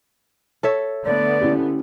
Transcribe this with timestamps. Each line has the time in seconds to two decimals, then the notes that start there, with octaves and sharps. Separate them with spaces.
0.63 A4 C#5 E5
1.05 D3 A3 B3 D5
1.41 C#4 E4 G4